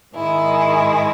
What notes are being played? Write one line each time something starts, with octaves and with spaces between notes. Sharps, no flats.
G#2 D#3 G#3 E4